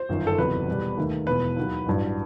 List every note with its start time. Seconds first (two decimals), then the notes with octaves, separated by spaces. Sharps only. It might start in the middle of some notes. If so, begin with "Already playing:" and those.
Already playing: C5
0.09 G1 F#2 D#3
0.27 A4
0.38 F#1 E2 C3 F#3 B4
0.68 E2 B2 G3
0.97 D#2 D#3 A3
1.27 E1 E2 B2 B4
1.57 D#2 D#3 F#3
1.86 A1 G2 F#3